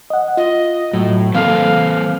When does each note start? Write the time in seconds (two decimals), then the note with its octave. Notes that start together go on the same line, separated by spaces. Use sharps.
0.10 D#5 F#5
0.37 F4 D#5
0.93 A2 F#3
1.34 E3 A#3 C4 A4 B4 C5 F5